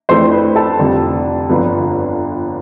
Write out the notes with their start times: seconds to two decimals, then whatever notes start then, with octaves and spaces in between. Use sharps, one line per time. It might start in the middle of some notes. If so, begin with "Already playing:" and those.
0.09 F2 E3 A3 D4 C5 C6
0.32 B4 B5
0.56 A4 A5
0.79 F1 F2 D3 G3
1.49 G1 F2 D3 F3 B3